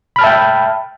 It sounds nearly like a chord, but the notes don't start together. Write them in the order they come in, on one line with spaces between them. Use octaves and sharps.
B5 F6 A5 E5 G5